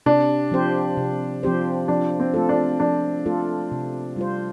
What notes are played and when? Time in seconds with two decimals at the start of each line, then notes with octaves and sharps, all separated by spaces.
0.06 C3 D4
0.51 F3 C4 G4 C5
0.97 C3
1.43 F3 C4 G4 C5
1.88 F3 D4
2.20 C4
2.34 A3 F4 A4
2.49 D4
2.80 F3 D4
3.26 A3 F4 A4
3.72 C3
4.16 G3 F4 C5